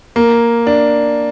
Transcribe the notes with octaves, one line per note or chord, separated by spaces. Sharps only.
A#3
D4